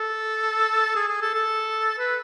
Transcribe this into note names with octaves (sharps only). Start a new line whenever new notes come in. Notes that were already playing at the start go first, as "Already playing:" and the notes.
Already playing: A4
G#4
G#4
A4
A4
B4